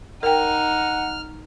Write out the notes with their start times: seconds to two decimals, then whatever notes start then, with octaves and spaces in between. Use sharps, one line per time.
0.23 D#4 A#4 F#5 G5 F6